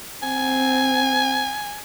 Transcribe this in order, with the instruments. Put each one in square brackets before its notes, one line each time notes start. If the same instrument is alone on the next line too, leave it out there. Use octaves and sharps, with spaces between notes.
[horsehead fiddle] C4 [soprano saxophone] G#5